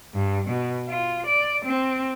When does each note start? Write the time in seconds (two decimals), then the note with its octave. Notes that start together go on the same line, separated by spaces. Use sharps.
0.15 G2
0.48 B2
0.89 F4
1.27 D5
1.65 C4